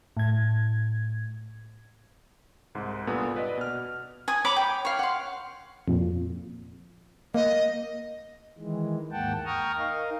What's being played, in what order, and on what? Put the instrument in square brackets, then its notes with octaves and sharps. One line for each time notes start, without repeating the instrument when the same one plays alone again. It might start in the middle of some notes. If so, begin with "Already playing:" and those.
[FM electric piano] A2 G#6
[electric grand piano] C2 G#2
G2 A#2 B3 A4 D#6
B4 D5 D#5
B2 F6
[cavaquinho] G#5 D#6
C#5 A#5 B5 D6
G5
C#5 F5
F#5 C6
[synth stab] F2 A#2
[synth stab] A#3 [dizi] D#5
[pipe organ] D#3 E3 G#3
D#2 G#2 A#3 F#5 G5 A5
G5 A#5 C#6 D#6 F6
D#4 A#4 D#5 F5